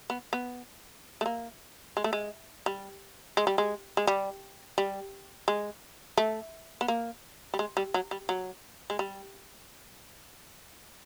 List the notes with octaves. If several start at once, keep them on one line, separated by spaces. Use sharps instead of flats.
B3
B3
A3
A#3
G#3
A3
G#3
G3
G#3
G3
G#3
G#3
G3
G3
G#3
A3
B3
A#3
G3
G#3
G3
F#3
G3
F#3
G#3
G3